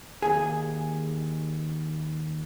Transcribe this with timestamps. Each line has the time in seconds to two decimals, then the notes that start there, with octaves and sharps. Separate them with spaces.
0.22 D#2 G#4